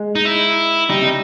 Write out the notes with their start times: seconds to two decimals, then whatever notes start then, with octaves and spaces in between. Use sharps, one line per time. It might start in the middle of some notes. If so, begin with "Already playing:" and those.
Already playing: G#3
0.15 D#4
0.25 E4
0.89 G3 D#4
1.01 C3